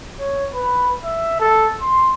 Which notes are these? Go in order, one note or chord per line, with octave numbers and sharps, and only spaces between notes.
C#5
B4
E5
A4
C6